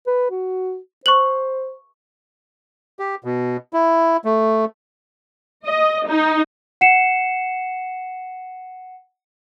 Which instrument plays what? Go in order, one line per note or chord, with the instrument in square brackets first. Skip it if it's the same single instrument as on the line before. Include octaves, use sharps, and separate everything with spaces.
[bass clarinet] B4
F#4
[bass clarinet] C5 [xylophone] C#6 F#6 F#7
[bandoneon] G4
B2
E4
A3
[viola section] D#5
D#4
[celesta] F#5 C7 C#7 E7